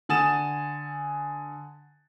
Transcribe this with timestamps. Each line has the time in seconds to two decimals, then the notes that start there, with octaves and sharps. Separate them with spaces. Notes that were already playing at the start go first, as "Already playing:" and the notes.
0.09 D3 F#5 G#5 D#6 A6 E7